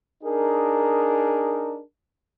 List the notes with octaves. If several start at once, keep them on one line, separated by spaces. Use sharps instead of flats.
D4 D#4 G#4 A#4